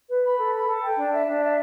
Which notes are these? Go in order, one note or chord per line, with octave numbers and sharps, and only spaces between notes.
B4
B5
A4
B5
A4
G5
D4
E5
D4
E5